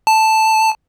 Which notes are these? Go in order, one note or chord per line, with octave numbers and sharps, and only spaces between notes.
A5